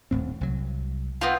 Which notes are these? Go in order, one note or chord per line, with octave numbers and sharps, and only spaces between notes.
D#1 A2 C4
C2 F#3
B3 C4 F4